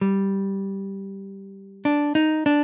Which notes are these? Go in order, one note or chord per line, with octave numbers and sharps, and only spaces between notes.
G3
D4
D#4
D4